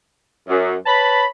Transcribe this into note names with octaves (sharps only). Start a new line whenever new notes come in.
F#2
B4 C#5 A5 B5